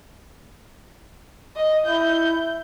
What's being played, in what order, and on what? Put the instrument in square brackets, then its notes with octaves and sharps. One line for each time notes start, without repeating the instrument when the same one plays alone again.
[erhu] D#5
[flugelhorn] E4 [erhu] G6